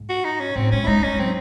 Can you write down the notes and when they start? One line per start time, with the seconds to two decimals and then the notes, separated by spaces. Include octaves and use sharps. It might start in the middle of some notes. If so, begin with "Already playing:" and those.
Already playing: G#2
0.09 F#4
0.24 D#4
0.40 C#4
0.56 A2 C4
0.71 G#3 C#4
0.83 E4
0.87 G#3 D#4
1.03 G#3 C#4
1.18 F#3 C4